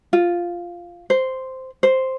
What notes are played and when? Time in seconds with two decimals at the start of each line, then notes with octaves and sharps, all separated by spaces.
0.13 F4
1.10 C5
1.83 C5